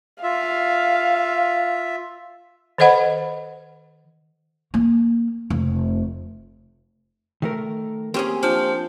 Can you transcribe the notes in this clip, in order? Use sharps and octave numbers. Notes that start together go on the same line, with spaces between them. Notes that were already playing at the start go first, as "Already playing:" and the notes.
F4 E5 F5
D#3 A4 C5 D#5 F#5 B5
A#3
F1
D#3 A3 A#4
A#3 C4 C#4 G4 G#4
F3 D4